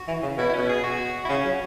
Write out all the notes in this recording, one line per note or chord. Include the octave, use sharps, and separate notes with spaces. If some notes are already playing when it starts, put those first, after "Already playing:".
Already playing: F#4
E3
C#3
B2 E4
E4
B2 C#4
G#4
F#4
E4
C#3 C#4
F#3